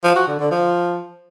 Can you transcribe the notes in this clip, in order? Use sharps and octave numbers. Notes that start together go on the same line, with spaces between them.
F3
F#4
D3
D3
F3